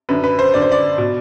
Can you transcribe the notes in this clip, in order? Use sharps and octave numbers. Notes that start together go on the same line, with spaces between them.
F#2 D3 B4
B4
C5
F#2 D3 D5
C5
D5
B2